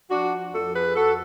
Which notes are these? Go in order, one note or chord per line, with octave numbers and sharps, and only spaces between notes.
F3 D4 F#4
F2 F#4 A4
G#4 B4
F2 F#4 A4